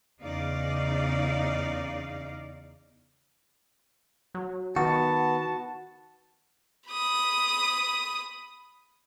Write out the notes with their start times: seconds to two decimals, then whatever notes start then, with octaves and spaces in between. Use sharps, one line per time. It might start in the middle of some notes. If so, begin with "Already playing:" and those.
0.22 E2 C#3 D#4 D5 F5
4.35 F#3
4.76 D#3 B3 F#4 A5
6.90 B5 D#6